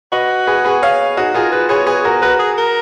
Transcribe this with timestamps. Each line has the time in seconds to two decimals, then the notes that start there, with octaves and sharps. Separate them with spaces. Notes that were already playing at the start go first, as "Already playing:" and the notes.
0.12 F#4 B4 D#5
0.47 G#4 B4
0.64 G#4 B4
0.82 C#5 F5
1.17 D#4 F#4 G#4
1.34 F4 G#4 A#4
1.52 F4 B4
1.69 G#4 B4 C#5
1.87 G#4 B4
2.05 F#4 A#4
2.22 F#4 A#4 B4
2.39 G#4
2.58 A#4